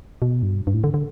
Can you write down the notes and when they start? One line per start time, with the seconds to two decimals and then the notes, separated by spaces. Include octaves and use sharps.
0.22 B2
0.43 G2
0.67 G2
0.74 A2
0.84 D3
0.94 D3